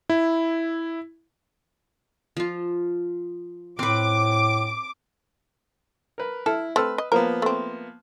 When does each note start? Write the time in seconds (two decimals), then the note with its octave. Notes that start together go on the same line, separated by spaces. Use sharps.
0.10 E4
2.37 F3 F4
3.79 A2 C4 B4 D6
6.18 A#4 B4
6.46 E4 A4 F6
6.76 A3 C4 B4 E6 F6
6.98 D#5
7.12 F3 A#3 B3 A#4
7.42 A3 C4